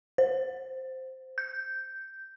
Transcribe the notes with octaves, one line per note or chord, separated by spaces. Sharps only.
C5
G6